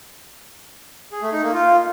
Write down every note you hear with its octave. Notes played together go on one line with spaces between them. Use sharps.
G#4
A3
D#4
A#3
F4